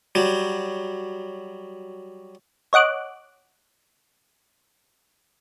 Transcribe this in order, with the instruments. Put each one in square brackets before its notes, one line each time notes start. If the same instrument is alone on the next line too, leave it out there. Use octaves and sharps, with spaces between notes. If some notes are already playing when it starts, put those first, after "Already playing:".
[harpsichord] F#3 G3
[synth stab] C#5 D#5 F#5 D6 F#6